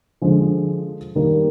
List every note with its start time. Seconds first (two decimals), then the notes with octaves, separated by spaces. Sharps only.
0.22 D3 F3 G#3
1.15 D#3 G3 A#3